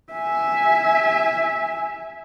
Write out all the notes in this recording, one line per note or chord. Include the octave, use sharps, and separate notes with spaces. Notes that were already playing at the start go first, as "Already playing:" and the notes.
E5 G#5